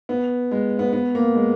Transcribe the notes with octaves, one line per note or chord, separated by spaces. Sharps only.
B3
G#3
B3
B3
A#3
G#3